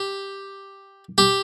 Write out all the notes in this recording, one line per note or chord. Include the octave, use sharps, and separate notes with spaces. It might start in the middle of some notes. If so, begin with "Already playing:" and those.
Already playing: G4
G4